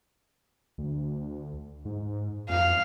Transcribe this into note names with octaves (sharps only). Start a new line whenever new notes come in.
D2
G#2
F2 F5